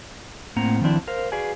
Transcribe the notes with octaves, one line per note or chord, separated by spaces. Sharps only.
A2 A#3 C4 F#5 A#5
D#3 F3 C4 D4 E4
A#4 C5 F5
F#4 G#4 B4 D5 F5 G#5